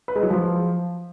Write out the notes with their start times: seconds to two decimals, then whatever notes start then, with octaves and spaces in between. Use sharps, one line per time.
0.08 B4
0.16 G#3
0.23 F#3
0.30 F3